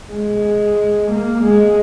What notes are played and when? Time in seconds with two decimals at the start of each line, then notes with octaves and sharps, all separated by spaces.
0.11 G#3
1.11 A#3
1.44 G#3